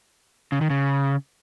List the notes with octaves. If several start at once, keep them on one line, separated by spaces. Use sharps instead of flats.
C#3
D#3
C#3